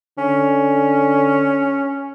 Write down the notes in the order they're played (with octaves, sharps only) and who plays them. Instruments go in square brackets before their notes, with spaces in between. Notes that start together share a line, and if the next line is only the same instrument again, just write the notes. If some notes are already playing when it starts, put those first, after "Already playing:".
[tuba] D3 [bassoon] C#4